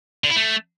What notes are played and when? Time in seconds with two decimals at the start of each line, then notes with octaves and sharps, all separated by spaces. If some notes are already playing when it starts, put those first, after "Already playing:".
0.24 D3
0.30 E4
0.36 A3